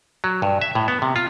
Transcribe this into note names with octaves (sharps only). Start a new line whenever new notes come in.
F#3
G2
E5
A2
B3
C3
F4